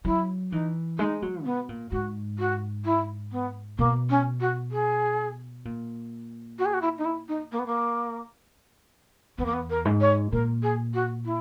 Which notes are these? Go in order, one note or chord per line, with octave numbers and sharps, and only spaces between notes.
F#3 E4
E3 D#4
G#3 D#4
F#3
B2 B3
A#2
G#2 F#4
F#4
E4
B3
B2 A#3
C#4
F#4
G#4
A#2
F#4
G#4
F#4
E4
D#4
E4
D#4
A#3
B3
A#3
E2 B3
A#3
B3
A#4
G#2
C#5
A#2 A#4
G#4
F#4
E4